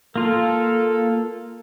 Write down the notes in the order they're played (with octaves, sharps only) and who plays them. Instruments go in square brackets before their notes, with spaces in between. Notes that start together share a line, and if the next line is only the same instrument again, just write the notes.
[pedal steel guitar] A#3 F4 [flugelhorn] A4